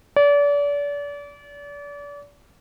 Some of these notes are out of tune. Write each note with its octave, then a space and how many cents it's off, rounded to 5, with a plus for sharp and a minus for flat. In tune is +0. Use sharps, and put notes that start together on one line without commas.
D5 -35